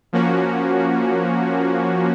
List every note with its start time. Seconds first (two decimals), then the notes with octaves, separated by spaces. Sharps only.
0.13 F3 A#3 C#4 F#4